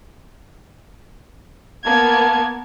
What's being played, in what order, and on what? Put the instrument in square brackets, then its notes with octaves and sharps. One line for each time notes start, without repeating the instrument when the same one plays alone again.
[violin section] A#3 B3 G#6 [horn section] F5 A5